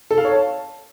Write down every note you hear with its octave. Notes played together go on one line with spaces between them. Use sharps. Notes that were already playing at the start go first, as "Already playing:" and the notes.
A4
F5
C#5
A5